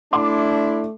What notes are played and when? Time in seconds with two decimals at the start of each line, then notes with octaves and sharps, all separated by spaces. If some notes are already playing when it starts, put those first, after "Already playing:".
0.13 A3 D4 E4 C6 D6